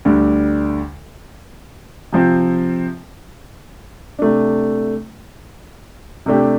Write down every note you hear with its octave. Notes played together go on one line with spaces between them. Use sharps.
D2 D3 G3
C3 F3 C4
C3 A3 D4
C3 A3 D4 G4